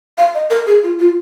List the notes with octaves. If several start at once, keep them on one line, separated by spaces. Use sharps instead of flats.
F5
D#5
A#4
G#4
F4
F4